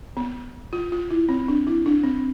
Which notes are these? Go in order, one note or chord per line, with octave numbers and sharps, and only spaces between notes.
B3
F4
F4
E4
C4
D4
E4
D4
C4